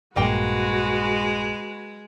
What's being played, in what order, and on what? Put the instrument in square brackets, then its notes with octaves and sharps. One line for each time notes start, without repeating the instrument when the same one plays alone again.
[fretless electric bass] A#1 G2 [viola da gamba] G#3 [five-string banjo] A#3 G5 [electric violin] F#4 B4